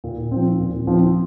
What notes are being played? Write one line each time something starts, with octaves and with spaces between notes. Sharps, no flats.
A#2
F3 C4
A#2
F3 C4